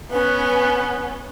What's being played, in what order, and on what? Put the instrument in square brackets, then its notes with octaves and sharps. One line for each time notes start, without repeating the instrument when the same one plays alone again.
[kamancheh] B3 C#4 [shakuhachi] B4